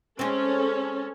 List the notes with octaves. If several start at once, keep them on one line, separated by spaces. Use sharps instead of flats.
G#3 C4 C#4 A4